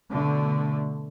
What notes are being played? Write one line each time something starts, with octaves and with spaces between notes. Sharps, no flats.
B2 D3 A3